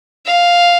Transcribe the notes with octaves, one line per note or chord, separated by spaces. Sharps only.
F5